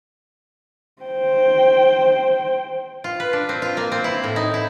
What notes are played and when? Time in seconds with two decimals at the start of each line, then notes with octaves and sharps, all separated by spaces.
1.03 C5 G5
3.04 F4
3.20 B4
3.33 D4
3.49 C4
3.62 F4
3.77 A#3
3.92 C4
4.04 E4
4.24 A2
4.36 D#4
4.54 E4